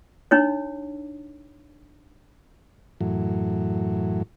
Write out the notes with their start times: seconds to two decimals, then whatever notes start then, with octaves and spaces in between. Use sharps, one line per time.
0.31 D4 D#4 C#5
3.01 F#2 A2 E3 F#3